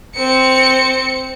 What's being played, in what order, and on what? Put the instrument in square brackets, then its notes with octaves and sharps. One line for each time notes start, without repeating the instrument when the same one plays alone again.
[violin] C4 C#7